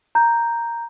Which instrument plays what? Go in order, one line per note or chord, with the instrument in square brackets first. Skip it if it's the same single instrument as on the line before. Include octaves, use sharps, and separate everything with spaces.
[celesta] A#5 G6